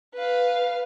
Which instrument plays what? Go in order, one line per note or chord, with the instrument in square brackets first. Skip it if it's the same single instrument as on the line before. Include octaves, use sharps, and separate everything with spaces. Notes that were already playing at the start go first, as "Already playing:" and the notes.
[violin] B4 F5